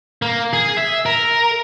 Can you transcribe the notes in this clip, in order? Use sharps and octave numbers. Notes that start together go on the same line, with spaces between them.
A#3
G#4
E5
A#4